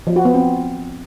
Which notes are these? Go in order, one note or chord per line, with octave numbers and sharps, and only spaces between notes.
F3
F#4
B3
C4